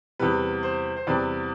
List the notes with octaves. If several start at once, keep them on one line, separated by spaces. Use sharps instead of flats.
E2 C3 G3 B4
C5
C5
E2 C3 G3 B4 D5